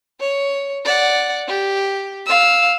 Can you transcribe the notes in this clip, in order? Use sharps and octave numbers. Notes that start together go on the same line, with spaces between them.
C#5
D5 F#5
G4
F5 E6